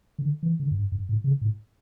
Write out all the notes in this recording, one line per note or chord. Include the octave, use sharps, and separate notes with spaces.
D3
E3
D3
F#2
G2
F#2
A2
C#3
A2